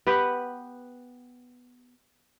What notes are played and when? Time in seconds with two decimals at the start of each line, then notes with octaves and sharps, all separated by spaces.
0.07 B3 G4 B4 F#5